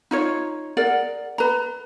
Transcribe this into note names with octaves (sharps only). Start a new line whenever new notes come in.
D#4 F4 C#5
G#4 A#4 D5 F#5
B4 A#5